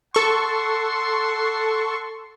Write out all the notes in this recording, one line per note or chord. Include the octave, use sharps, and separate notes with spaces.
A4 F#5 C6 C#6